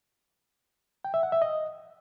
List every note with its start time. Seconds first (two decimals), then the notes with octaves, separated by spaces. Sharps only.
1.05 G5
1.14 E5
1.23 F#5
1.32 E5
1.42 D#5